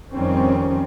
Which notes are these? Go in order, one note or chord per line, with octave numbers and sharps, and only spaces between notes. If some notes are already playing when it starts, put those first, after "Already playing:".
F2 D#3 G3 C4 C#4